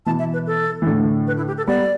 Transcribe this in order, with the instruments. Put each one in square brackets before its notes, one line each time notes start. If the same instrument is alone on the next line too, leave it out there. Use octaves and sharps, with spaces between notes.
[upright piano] B2 E3 [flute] A5
[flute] E5
B4
A4
[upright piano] E3
A2 D3
[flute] B4
E4
G4
A4
[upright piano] G3 B3 [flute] D5